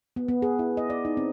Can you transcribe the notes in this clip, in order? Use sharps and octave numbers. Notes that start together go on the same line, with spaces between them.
B3
B3
G#4
E4
D#5
D5
D#4
C4